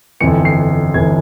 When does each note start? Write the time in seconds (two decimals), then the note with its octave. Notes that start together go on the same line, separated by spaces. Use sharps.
0.20 G1 F2 E3 C#7
0.45 C7
0.94 G1 F2 E3 G#6